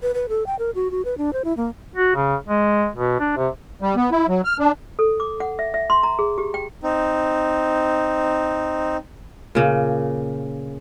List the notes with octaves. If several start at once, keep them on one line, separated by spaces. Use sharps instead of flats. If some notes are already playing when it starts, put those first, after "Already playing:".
B4
B4
A4
G5
A#4
F#4
F#4
B4
D4
C5
E4
A#3
F#4
C#3
G#3
B2
D4
C3
G3
B3
E4
F#3
F6
D4
A4
D6
F#5
E5
E5
C6
A#5
G#4
G4
G5
C4 D#4
A#2 C#3